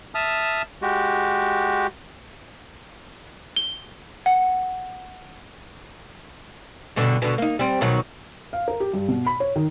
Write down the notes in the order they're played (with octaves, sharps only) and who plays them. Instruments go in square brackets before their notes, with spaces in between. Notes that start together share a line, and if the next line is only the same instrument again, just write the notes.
[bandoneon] E5 A5 D#6 F6
G#3 F#4 G4
[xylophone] G7
F#5
[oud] G2 B2 D3
B2 D3
A#3 D#4
G3 C4
B2 D#3 F#3
[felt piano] F5
A#4
G4
G2
B2
B5
C#5
D#3